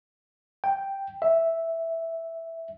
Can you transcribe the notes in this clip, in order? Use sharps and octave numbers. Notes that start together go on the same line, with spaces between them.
G5
E5